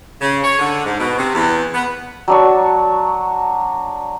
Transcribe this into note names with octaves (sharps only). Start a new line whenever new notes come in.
C#3
C#5
D3
G#2
B2
C3
E2
B3
F#3 D4 C#6